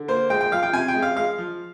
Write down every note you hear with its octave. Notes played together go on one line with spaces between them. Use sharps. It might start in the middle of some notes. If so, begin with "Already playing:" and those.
Already playing: D3
A#3 C5
G#3 G5
G5
F3 F5
G5
C3 G#5
G5
G#3
F5
G#3 F5
F3